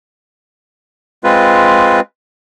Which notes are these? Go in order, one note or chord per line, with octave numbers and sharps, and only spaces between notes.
G#3 C4 F4 B4